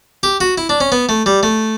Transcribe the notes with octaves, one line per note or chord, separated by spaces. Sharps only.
G4
F#4
E4
D4
C#4
B3
A3
G3
A3